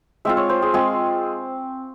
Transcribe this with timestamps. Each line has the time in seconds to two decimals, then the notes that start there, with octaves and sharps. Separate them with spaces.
0.25 G#3 C4 F4 E5
0.37 C#5
0.49 C5
0.62 G#4
0.74 G#3 C4 F4 G#4